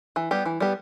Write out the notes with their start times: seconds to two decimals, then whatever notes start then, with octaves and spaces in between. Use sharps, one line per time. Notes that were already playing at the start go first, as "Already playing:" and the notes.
0.16 E3
0.31 G3 B3 G4
0.45 E3
0.60 G3 B3 G4